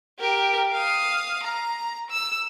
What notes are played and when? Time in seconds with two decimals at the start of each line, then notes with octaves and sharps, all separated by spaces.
0.19 G4 A#4
0.73 F5 D#6
1.44 A#5
2.10 E6